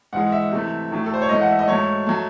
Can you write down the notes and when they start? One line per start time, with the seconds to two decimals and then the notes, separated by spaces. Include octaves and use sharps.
0.13 G#2 E3 G#3 F#5
0.32 E5
0.52 C3 E3 A3
0.91 A2 F#3 A3
1.06 A4
1.14 C5
1.22 C#5
1.29 G#2 E3 A3 D#5
1.41 F#5
1.50 E5
1.59 D#5
1.68 G#2 F#3 A3 C#5
2.07 F#3 A3